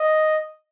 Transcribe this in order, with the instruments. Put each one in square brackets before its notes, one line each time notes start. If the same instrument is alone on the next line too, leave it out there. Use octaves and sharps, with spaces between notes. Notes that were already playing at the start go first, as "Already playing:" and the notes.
Already playing: [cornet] D#5